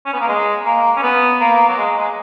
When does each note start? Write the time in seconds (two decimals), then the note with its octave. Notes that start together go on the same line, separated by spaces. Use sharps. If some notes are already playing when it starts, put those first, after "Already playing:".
0.06 C#4
0.13 B3
0.20 A#3
0.28 G#3
0.65 A#3
0.97 C#4
1.03 B3
1.40 A#3
1.69 F#3
1.77 G#3
1.96 G#3